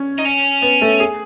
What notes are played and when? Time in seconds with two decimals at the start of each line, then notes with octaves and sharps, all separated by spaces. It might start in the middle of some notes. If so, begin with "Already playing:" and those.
Already playing: C#4
0.18 D#4
0.25 C#4
0.62 B3
0.81 A3
1.00 G#4